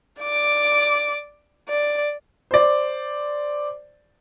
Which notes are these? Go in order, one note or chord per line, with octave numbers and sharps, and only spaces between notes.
D5 D6
D5
C5 D5